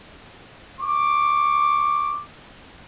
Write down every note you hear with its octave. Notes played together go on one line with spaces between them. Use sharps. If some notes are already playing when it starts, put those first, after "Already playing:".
C#6 D6